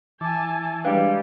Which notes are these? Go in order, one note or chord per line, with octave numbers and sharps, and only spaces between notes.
E3 G#5 A5 D6
G3 G#3 D4 B4 D5 F5 G5